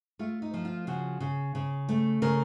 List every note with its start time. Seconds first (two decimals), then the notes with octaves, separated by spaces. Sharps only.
0.19 A3 F4
0.42 D#4
0.54 F3
0.65 F4
0.87 C#3 F#4
1.20 C#3
1.55 C#3
1.89 A3
2.22 C#3 A#4